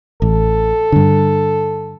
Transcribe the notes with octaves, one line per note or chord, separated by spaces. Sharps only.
A1 A4
G2 D3